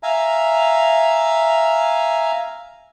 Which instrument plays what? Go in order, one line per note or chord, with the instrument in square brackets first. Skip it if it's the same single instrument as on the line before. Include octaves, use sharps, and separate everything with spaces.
[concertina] E5 F5 G#5 A#5